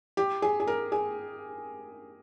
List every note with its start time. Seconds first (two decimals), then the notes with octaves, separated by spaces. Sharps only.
0.17 G4
0.42 G#4
0.60 G#4
0.67 A#4
0.92 G#4